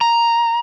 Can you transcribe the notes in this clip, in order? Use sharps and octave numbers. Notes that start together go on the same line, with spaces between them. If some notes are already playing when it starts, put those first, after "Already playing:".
A#5